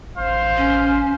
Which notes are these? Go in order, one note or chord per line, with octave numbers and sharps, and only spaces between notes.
A1 C5 F5 C6
C#4